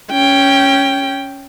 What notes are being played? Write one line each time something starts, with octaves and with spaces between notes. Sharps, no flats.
C#4 G5